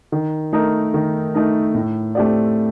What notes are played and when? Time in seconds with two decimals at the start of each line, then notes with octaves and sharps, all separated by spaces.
0.12 D#3
0.53 A3 D#4 A#4
0.94 D#3
1.34 A3 D#4 A#4
1.74 A2
2.15 A3 C4 G4 D5